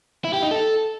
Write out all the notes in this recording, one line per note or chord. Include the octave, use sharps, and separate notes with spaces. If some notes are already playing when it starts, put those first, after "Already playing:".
E4
G4
D#4
A4